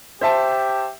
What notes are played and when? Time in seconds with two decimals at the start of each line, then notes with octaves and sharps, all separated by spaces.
0.21 G4 C5 E5 A5